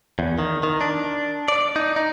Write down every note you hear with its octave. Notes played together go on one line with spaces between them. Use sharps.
E2
D#3
D#3
D4
D5
D#4
D#4